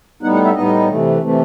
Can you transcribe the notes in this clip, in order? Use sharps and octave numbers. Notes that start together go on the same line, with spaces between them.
A2 G3 B3 D#4 F#5
F#5
E5
A2 G3 B3 D#4 D#5
C3 E3 A3
C3 E3 A3